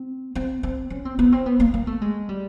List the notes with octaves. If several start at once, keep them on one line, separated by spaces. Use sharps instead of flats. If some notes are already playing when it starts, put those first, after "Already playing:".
Already playing: C4
C4
C4
C#4
C4
B3
C4
B3
A#3
A#3
A3
G#3
G3